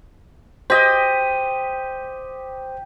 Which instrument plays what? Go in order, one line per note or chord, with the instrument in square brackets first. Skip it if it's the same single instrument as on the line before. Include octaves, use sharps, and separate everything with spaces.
[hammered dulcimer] G4 D#5 [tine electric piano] C5